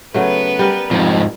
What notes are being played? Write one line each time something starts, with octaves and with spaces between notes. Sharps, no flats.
C#3 F#3 A3 B3 B4
G3 A#4
F2 G#2 C3 F3